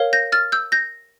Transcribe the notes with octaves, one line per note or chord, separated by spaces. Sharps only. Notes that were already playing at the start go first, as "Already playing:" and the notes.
Already playing: A#4 C#5 F5
G6 A#6
F6 A6
E6 G6
G6 A#6